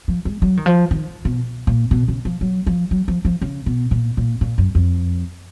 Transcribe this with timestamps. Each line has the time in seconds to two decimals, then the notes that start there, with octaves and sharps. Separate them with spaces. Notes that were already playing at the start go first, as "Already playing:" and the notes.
0.08 F3
0.25 G#3
0.42 F#3
0.57 D#3
0.66 F3
0.91 D#3
1.25 B2
1.67 A#2
1.91 B2
2.08 C#3
2.25 F3
2.41 F#3
2.67 F3
2.91 F#3
3.08 F3
3.25 F3
3.41 C#3
3.66 B2
3.91 A#2
4.17 A#2
4.41 A#2
4.58 F#2
4.75 F2